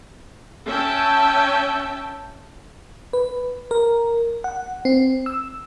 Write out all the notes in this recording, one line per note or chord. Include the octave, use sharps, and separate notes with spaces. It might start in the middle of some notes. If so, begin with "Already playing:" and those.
C#4 E5 G5 A5
B4
A#4
F#5
C4
E6